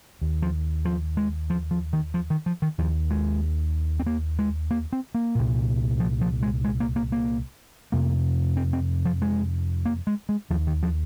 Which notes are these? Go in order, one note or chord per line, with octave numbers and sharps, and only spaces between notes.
D#2
F3
F3
G#3
F3
F3
D#3
F3
D#3
F3
D#3
D#2 F3
G#3
C4
A#3
G#3
A#3
C4
A#3
C2 A#2
F3
F3
G#3
G#3
A#3
A#3
A#3
F2 C3 A#3
C4
C4
F3
G#3
A#3
G#3
G#3
D#2 F3
D#3
F3